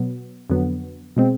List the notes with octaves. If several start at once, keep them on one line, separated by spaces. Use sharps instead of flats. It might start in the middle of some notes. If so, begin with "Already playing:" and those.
Already playing: B2 F#3 B3
F2 D3 F#3 B3
B2 G#3 C4